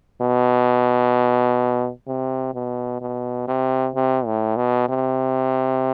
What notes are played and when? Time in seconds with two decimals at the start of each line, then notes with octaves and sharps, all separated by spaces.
0.22 B2
2.07 C3
2.54 B2
3.01 B2
3.48 C3
3.95 C3
4.26 A2
4.57 B2
4.89 C3